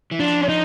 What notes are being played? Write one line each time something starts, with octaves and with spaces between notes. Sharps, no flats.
E3
F3 D4
D#4